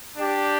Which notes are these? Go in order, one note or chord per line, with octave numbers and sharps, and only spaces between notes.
D4 G4 D5 G5